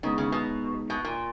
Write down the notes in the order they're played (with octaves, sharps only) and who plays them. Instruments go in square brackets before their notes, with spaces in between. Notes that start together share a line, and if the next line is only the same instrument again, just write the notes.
[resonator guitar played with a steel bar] C#3 [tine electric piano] G#3 B3 D#4
[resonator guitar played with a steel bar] C#3
B2
B2
A#2